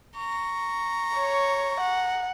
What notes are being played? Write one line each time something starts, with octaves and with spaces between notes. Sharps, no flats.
A#5 C#6
C#5
F#5